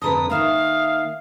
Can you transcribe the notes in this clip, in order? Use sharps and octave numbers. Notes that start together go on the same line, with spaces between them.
F2 D3 B4 A5 A#5 D#6
D#3 A#3 E5 F5 D#6